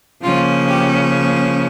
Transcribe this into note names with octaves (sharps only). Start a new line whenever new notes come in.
C#3 F3 A#3 C#4 F4
G4